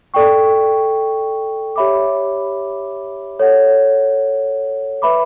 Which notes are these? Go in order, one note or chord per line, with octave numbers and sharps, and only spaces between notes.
A4 D5 G5 C#6
G4 C#5 E5 B5 D6
A4 C#5 F#5
B4 E5 B5 D6